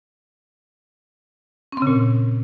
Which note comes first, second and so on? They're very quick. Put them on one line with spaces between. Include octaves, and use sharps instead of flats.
C#4 C4 C#3 A#2